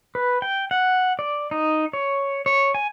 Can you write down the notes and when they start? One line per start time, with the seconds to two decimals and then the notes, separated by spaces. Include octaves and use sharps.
0.15 B4
0.42 G5
0.71 F#5
1.19 D5
1.51 D#4
1.93 C#5
2.46 C#5
2.75 G#5